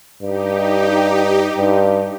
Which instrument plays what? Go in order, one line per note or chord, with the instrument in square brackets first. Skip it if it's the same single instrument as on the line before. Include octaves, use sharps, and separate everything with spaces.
[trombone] G2 [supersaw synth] D#4 G4
[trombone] G2